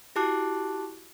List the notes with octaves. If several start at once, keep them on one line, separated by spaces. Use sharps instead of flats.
E4 F#4 G4 A5 D6 F#6